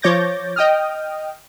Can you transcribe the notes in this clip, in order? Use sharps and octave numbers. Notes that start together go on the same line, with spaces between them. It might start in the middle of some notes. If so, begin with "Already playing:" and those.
F3 C#5 D6 G6 A6 A#6
D#5 G5 D#6 F6